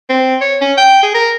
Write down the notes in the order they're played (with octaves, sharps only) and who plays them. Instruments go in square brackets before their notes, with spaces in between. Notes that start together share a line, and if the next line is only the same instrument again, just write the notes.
[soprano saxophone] C4
C#5
C#4
G5
G#4
A#4